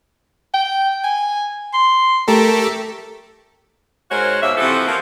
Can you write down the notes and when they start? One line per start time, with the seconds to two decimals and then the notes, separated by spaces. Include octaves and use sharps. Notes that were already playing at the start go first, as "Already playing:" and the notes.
0.54 G5
1.04 G#5
1.73 C6
2.28 A3 G4 A4 A#4
4.11 G#2 G#3 F#4 A#4 C5 C#5
4.41 D#2 B2 A#3 B4 E5
4.57 C3 E3 F3 F#4 A4
4.87 F3 A#3